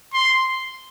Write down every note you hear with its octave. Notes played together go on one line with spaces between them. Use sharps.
C6